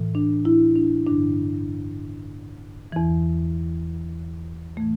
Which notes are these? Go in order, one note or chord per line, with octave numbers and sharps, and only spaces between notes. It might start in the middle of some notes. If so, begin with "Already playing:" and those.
Already playing: A2 E3
D4
E4
D4
G2 D3 D4
E2 E3
A2 E3 A3